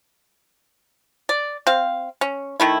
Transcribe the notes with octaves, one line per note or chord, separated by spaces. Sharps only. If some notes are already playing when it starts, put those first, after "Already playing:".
D5
C4 F5
C#4
D#3 A3 E4